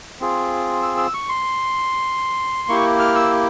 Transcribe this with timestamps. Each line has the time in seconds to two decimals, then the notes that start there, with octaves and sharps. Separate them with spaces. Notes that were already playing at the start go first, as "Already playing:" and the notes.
0.20 C4 F4 G#4
0.82 E6
0.97 E6
1.14 C#6
1.29 C6
2.68 A#3 E4 G4 C#6
2.99 F6
3.15 E6